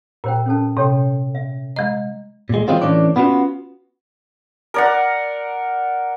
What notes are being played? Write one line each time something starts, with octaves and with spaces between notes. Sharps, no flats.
A#2 A#4 C5 G5
C#4 A4 A5
C3 A4 C#5 G5
E5
G#3 D#5 A#5
A#2 G#3
F3 F#3 G#3 C4 F4
A2 E3 C#4 D4 D5
B3 C#4 D4 F4 F#4
A#4 D5 F#5